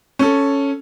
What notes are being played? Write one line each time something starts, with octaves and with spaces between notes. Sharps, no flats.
C#4 A4